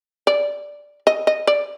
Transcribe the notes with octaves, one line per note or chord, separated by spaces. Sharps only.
D5
D#5
D#5
D5